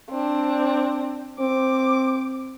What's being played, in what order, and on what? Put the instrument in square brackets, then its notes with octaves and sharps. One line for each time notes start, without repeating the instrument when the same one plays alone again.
[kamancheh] C4 D4
[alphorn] C4 [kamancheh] D6